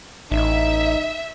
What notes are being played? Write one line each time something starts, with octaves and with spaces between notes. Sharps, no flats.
A1 D#4 E5